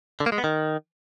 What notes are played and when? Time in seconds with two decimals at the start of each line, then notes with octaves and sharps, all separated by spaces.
0.20 D3
0.26 A#3
0.32 G#3
0.38 B3
0.44 D#3